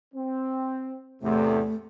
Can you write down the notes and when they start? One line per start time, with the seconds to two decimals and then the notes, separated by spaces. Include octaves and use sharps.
0.14 C4
1.22 E2 A2 C3 A3